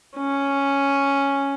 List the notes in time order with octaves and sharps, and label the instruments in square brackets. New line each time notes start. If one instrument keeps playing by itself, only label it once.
[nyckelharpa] C#4